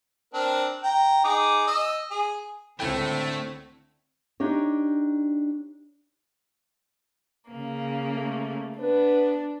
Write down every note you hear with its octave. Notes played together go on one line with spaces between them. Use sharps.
C4 D4 A#4
G5 A#5
D#4 G#4 D6
D#5 E6
G#4
C#2 A2 D3 A3 C4 G5
D4 D#4 G4 C#5
C#3 A#3
A3
B3 D4 B4